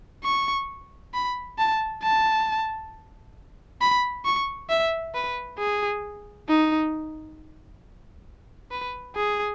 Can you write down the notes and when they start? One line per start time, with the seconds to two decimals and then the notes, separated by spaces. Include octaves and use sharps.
0.24 C#6
1.14 B5
1.59 A5
2.03 A5
3.81 B5
4.25 C#6
4.70 E5
5.15 B4
5.59 G#4
6.49 D#4
8.71 B4
9.16 G#4